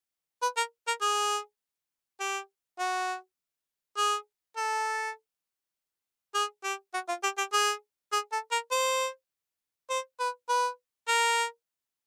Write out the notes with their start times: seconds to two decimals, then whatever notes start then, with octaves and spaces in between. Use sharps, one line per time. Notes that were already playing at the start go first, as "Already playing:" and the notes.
0.42 B4
0.57 A#4
0.87 A#4
1.01 G#4
2.20 G4
2.79 F#4
3.97 G#4
4.57 A4
6.35 G#4
6.64 G4
6.94 F#4
7.08 F4
7.23 G4
7.38 G4
7.53 G#4
8.12 G#4
8.32 A4
8.51 A#4
8.71 C5
9.90 C5
10.20 B4
10.49 B4
11.08 A#4